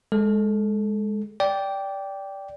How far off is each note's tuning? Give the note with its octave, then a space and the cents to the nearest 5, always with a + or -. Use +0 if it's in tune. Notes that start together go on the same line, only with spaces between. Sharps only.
G#3 +0 A4 -5
D5 -15 G5 +0